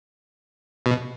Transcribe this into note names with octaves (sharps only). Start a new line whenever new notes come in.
B2